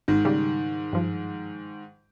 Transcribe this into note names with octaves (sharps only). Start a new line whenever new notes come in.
G#1 G#2 D#3
C#3 G3
G2 F3